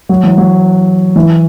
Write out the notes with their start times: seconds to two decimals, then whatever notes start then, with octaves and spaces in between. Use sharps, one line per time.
0.09 F#3
0.23 E3
0.38 F#3
1.16 E3